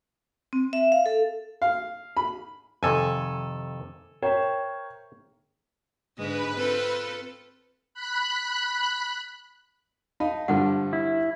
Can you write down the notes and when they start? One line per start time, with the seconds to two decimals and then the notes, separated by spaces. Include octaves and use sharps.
0.53 C4
0.73 E5
0.92 F5
1.06 A4
1.62 F5
2.17 B5
2.83 F2 C3 D#3 A4 G#5
4.22 A#4 C5 C#5 E5 G5
6.19 G#2 D3 G#3 B4
6.57 C4 F4 A4
7.94 B5 F#6
10.20 D#4 F5 A5 B5
10.48 G2 D3 F3 F#5
10.93 E4